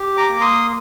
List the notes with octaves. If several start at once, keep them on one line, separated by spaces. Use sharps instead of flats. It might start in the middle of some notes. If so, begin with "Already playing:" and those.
Already playing: G4
A#5 D6
A#3
C6 D#6